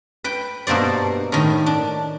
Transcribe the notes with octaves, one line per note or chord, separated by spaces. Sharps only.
B4 G5
G2 B2 A#3 C5 D5
A2 D#3
D4